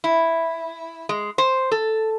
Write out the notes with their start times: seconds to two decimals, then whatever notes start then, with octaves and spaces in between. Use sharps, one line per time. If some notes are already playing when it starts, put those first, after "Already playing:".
0.04 E4
1.09 G#3
1.38 C5
1.72 A4